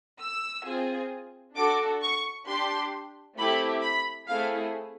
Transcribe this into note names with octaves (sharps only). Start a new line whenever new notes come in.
E6
C4 F4 G#4
D4 F#4 A4 D6
C#6
D4 G4 C6
A3 C4 E4 G4 B5
B5
A3 C4 E4 G#4 F5